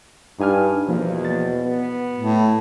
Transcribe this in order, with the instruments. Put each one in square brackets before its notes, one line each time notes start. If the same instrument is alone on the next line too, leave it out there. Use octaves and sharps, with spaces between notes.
[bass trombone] G2 [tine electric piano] D#4 G#5 F6
[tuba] E2 [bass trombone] B2 [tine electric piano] F3 A#3
[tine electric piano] A6
[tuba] B3
[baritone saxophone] A2